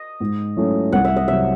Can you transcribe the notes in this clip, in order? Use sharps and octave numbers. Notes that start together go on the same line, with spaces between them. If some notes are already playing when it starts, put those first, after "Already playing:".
Already playing: D#5
G#2
F#3 A3 C#4 E4
C2 F#5
E5
D#5
C3 F#3 E5